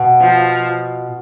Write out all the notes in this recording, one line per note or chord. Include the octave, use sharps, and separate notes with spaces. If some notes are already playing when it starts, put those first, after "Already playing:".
Already playing: B2
F3